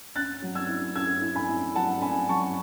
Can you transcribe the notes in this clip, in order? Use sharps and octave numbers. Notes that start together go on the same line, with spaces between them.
C#4 F#6 A6
F#3
E6 G#6
E4
C#4 E6 G#6
E4
G#5 B5
E4
F#3 F#5 A5
C#4 G#5 B5
F#3 A5 C#6